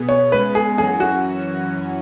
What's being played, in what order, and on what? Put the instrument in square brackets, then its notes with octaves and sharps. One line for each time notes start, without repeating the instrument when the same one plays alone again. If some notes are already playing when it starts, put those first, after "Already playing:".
Already playing: [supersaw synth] B2 B3 G#4
[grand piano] C#5
[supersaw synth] C#3 G#3 B3 [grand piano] B4
[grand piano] G#4
[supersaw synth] F#2 E3 C#4 F#4 [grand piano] G#4
[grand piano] F#4